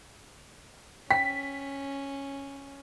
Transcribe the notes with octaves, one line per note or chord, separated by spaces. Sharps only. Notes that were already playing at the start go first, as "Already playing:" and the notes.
C#4 G5 B6